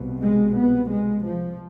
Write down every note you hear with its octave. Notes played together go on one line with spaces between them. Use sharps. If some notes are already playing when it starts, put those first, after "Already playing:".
Already playing: C2 B2
G#3
B3
G#3
F3